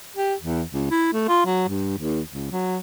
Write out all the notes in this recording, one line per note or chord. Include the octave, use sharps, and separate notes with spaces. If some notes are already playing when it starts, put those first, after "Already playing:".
G4
E2
C#2
E4
A3
F4
F#3
G2
D#2
C#2
F#3